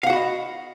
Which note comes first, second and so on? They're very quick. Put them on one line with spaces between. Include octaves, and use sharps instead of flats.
F5 F#5 F#4 B5 D#5